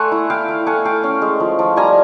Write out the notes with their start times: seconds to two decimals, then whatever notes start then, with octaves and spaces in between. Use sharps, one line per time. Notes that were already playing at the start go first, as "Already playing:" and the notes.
Already playing: A3 F#5 G#5 C6
0.12 E4
0.30 E4 F5 G5
0.48 E4
0.67 A3 F#5 G#5
0.85 A3 F5 G5
1.03 C#4
1.22 G#3
1.40 F3
1.59 F3
1.76 G3 G#5 A#5